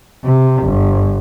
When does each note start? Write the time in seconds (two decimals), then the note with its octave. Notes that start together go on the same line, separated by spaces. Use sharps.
0.24 C3
0.63 G1